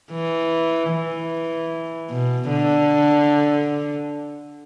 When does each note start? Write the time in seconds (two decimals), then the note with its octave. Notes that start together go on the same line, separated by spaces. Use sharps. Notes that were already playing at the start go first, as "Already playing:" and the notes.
0.12 E3
0.91 E3
2.10 B2
2.50 D3